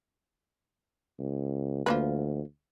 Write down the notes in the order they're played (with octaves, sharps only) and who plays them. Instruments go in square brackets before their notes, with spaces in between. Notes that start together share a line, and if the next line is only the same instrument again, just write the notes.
[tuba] C#2
[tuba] D2 [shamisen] F3 A#3 B4